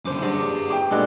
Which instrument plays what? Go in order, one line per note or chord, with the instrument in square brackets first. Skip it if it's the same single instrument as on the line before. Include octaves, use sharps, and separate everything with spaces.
[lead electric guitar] F#2 D3 [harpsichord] C5 D6
[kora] G2 [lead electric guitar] G#4 F#5 [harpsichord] D5
[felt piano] G5 D6
[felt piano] A#2 D4 [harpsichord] G3 A4 F#5 [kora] G#3 B3 F#4